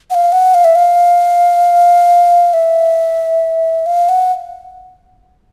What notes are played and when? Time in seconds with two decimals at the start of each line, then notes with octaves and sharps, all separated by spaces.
0.10 F#5
0.14 F5
0.32 F#5
0.54 F5
0.64 E5
0.75 F5
2.53 E5
3.86 F5
4.09 F#5